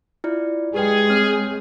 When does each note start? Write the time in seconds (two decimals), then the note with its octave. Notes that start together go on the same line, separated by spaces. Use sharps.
0.24 E4 F4 D5
0.74 G#3 G4 G#4 B4 G5
1.10 C4 C#5 F6